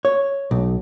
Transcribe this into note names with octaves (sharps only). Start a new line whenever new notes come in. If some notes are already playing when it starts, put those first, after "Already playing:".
C#5
B1